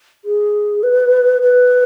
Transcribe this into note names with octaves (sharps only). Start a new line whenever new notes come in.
G#4
B4
B4